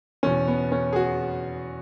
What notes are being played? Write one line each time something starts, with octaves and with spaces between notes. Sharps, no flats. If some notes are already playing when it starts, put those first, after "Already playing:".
E2 B2 C#4
B3
C#4
G#4
F#4